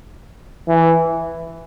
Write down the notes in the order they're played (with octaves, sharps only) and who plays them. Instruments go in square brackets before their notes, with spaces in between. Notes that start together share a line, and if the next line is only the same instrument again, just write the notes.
[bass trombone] E3